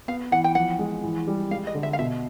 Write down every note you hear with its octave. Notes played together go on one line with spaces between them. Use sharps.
B3 F5
E3 F#5
G5
F3 F#5
G#3
E3
G3
G#3 F5
D#5
D3
E5
F5
B2 E5